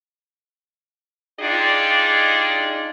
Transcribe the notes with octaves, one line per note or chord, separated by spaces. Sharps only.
D4 D#4 F4 G4 G#4 D5